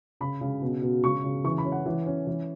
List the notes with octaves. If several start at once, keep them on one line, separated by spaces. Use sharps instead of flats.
C#3 B5
C#3
B2
B2
C#3 C#6
C#3
E3 C#6
B5
C#4
F#5
E3
C#4
E3